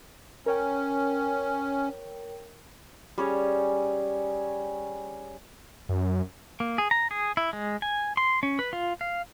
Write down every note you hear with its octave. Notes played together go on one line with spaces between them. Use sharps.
C#4 A#4 C#5 G5
G3 C#4 G#4
F#2
A#3
G#4
A#5
G#4
E4
G#3
G#5
C6
C#4
B4
F4
F5